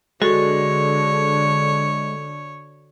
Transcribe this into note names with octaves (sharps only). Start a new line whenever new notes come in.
D3 G#3 F#4 A4 C#5